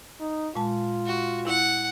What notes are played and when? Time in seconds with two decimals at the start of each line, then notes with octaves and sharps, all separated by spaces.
0.20 D#4
0.55 A#2 G#3 F4 A5
1.06 F#4
1.47 E4 F#5